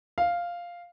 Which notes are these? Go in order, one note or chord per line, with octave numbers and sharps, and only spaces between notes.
F5